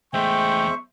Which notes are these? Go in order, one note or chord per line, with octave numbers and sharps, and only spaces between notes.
E2 G#3 A3 C5 E5 G5 C#6